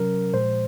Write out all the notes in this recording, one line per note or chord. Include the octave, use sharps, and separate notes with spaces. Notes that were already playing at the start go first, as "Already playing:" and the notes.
Already playing: C3 F#3 C#4 A#4
A#2 F3 G#3 C5